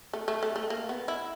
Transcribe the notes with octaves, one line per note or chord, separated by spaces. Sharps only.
A3
A3
A3
A3
A#3
B3
E4